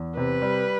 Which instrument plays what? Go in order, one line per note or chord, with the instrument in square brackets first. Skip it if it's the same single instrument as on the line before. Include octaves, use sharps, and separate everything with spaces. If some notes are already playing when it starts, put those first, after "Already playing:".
Already playing: [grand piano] E2
[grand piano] C3 [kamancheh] B4
[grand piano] G3